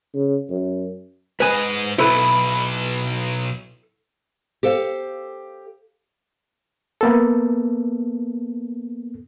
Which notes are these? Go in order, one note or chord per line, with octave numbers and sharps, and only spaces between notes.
C#3
F#2
G#2 B4 D#5 G#5
B1 B2 E4 A4 B4
G4 A4 C5 F5
A#3 B3 A4